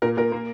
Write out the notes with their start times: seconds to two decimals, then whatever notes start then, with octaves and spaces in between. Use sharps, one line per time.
0.02 A#2 A#4
0.17 A#2 A#4
0.32 A#3